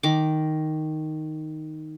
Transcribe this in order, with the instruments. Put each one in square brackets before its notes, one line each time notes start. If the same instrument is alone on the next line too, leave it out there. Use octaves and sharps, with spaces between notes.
[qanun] D#3 D6